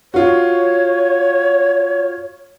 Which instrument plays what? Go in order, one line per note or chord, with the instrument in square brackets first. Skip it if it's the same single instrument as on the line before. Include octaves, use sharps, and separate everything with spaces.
[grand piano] F4 F#4 [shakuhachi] C#5